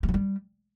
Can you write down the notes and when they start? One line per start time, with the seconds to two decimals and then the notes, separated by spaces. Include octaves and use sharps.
0.03 G3
0.09 F#3
0.14 G3